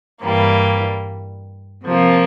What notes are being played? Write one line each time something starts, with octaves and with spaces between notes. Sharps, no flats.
G2 E3 G3 A#3
C3 F3 A#3